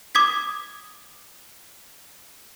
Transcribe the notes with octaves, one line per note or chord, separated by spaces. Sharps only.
D6 D#6 G#6 B6